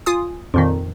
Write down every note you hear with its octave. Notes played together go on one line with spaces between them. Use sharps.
F4 G#5 D#6
F2 A#2 D#3